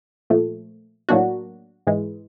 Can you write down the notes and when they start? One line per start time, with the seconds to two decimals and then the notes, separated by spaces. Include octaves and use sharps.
0.30 A#2 F3 A3
1.09 A2 F#3 A#3 D4 F#4
1.87 G#2 E3 G#3